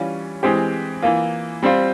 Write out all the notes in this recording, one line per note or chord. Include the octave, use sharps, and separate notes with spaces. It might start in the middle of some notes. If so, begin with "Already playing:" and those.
Already playing: E3 G3 C#4 F4
E3 G#3 C4 G4 C5
E3 A#3 F4
G3 C4 F4 C5